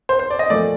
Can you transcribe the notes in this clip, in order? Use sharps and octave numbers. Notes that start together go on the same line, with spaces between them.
C5
C5
D5
D#5
A#2 F3 A3 D5